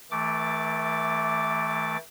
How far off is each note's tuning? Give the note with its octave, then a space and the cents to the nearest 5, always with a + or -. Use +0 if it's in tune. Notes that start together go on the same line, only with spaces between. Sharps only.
E3 -40 A3 +0 D6 -5